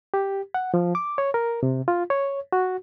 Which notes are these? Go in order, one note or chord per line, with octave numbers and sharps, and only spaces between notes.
G4
F#5
F3
D6
C#5
A#4
C3
F4
C#5
F#4